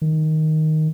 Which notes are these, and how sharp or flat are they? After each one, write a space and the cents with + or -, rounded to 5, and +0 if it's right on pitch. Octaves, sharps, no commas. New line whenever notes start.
D#3 +5